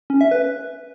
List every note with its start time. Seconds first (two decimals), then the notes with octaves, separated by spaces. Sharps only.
0.10 C#4
0.21 E5
0.31 B4